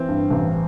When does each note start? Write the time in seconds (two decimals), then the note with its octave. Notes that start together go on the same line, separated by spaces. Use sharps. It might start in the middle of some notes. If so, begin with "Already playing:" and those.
Already playing: E3 C4
0.08 G2
0.31 A1